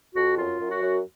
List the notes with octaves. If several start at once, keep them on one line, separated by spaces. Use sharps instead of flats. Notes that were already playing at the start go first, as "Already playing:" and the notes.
F2 F#4
F#2 F4
F#2
F#4
F#2